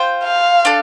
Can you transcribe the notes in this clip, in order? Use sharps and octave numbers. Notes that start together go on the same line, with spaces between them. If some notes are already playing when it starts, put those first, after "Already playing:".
Already playing: F4 C5 G5
F5
D4 A4